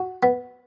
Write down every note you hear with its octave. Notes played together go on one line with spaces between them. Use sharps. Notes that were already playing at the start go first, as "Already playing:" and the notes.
Already playing: F#4
B3